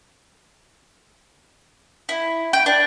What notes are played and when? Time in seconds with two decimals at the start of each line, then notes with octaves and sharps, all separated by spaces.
2.09 E4
2.53 G5
2.66 D4